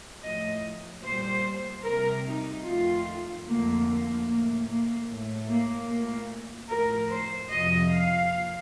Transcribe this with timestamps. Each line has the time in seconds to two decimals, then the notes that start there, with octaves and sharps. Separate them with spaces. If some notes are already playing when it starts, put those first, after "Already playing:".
0.22 A2 F3 A3 D#5
1.03 A#2 G3 C5
1.84 C3 G3 A#4
2.25 D#4
2.65 F2 D#3 A3 F4
3.46 F2 D3 A3 A#3
3.86 A#3
4.26 A2 A3 A#3
4.67 A#3
5.07 A2 A3
5.48 A#3
5.88 A#2 A3 A#3
6.69 A2 F3 A3 A#4
7.09 C5
7.50 F2 C3 F3 D#5
7.90 F5
8.30 A#2 F3